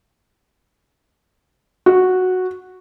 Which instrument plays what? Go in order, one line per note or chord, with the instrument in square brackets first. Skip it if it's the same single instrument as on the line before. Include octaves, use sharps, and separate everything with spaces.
[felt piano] F#4